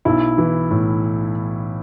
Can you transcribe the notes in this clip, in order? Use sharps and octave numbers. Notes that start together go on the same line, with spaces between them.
B1 E4
E3
A2